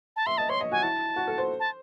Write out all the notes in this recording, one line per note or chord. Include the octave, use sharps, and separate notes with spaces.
A5
E5 C6
D#5 A5
C#5 C6
D#5
F#4 G#5
E4 A5
F#4
A4
C5
A5